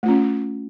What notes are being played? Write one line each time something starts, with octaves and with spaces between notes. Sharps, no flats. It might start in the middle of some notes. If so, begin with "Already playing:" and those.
A3 C#4 F4